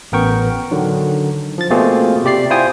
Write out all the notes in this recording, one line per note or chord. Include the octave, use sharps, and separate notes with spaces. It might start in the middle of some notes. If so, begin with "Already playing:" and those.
A1 B3 A#4 G5 C#6
D3 D#3 F#3
F3 A6
B2 A3 A#3 C4 F4 G#4
C3 G4 D5 C7
E4 F4 C5 G5 G#5 D#6